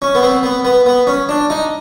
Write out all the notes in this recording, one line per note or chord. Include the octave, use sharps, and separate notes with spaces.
C#4
B3
C4
B3
B3
B3
C#4
D4
D#4